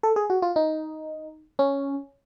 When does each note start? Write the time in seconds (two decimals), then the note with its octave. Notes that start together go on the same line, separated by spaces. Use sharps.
0.03 A4
0.16 G#4
0.30 F#4
0.42 F4
0.56 D#4
1.59 C#4